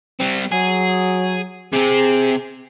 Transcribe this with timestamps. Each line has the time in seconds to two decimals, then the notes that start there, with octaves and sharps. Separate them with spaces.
0.20 G3 C4
0.52 F#3 G#4
1.73 C3 C4 G#4